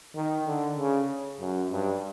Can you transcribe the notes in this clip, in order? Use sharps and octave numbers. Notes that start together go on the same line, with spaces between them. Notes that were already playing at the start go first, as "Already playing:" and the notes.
D#3
D3
C#3
F#2
G2